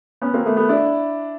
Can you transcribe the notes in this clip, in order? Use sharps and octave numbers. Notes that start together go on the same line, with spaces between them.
B3 C#4
A#3 C4
A3 B3
A3 B3
D4 E4